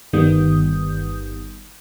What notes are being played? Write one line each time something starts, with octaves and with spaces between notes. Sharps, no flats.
G1 D#3 G3 B3 D#6 G6